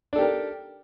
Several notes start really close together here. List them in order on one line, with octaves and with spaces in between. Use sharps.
D4 A4 G4 A#4